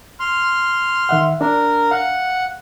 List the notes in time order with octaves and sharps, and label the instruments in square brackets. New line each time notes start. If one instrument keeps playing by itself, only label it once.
[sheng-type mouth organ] C6 F6
[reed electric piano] D#3 E5 F#5
[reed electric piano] D4 [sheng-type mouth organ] A#4
[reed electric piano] F5 [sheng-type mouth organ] F#5